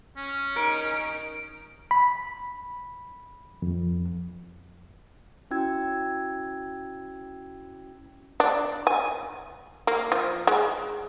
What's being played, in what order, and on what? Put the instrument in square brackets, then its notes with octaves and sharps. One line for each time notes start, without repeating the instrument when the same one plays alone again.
[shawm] C#4
[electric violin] D#4 D7 [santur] A#4
[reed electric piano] B5
F2
[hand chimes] C#4 E4 F#4 G5 E6 G#6
[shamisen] D4
G#5
A#3
F3
G#3